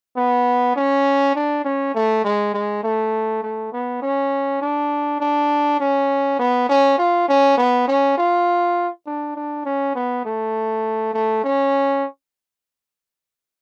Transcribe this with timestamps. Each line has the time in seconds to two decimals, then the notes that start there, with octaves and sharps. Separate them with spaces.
0.17 B3
0.76 C#4
1.35 D4
1.64 C#4
1.95 A3
2.24 G#3
2.54 G#3
2.83 A3
3.43 A3
3.73 B3
4.02 C#4
4.61 D4
5.20 D4
5.80 C#4
6.39 B3
6.69 C#4
6.98 F4
7.28 C#4
7.57 B3
7.88 C#4
8.17 F4
9.06 D4
9.36 D4
9.65 C#4
9.95 B3
10.25 A3
11.13 A3
11.44 C#4